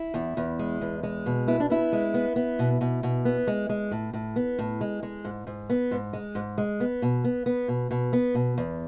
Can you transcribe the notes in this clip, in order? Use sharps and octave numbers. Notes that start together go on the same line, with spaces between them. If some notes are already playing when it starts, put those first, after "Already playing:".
Already playing: E4
E2
E2
G#3
E2
G#3
B2
B3 E4
D4
B3 E4
G#3
B3
B3
B2
B2
B2
B3
G#3
G#3
A2
A2
B3
A2
G#3
G#3
G#2
G#2
B3
G#2
G#3
G#2
G#3
B3
B2
B3
B3
B2
B2
B3
B2
E2